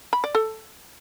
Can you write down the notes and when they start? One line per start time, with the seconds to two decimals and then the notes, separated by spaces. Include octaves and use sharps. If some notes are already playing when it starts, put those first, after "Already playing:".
0.13 B5
0.24 D5
0.35 A4